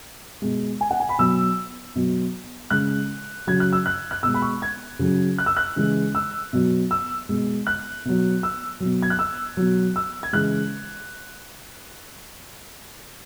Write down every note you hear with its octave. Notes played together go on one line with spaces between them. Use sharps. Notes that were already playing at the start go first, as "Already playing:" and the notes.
B2 G#3
G#5
F#5
G#5
B5
B2 F#3 E6
B2 F#3
C#3 G#3 F#6
C#3 F#3 G#6
F#6
E6
F#6
F#6
B2 G#3 E6
B5
C#6
G#6
C#3 F#3
F#6
E6
F#6
C#3 E3 G#3
E6
B2 F#3
E6
B2 G#3
F#6
B2 F#3
E6
B2 F#3
G#6
F#6
E6
B2 F#3
E6
G#6
C#3 E3 G#3 F#6